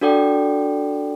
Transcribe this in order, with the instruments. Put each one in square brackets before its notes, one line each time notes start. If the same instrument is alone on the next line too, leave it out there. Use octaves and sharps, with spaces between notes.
[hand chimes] D4 F#4 A4 D5 G5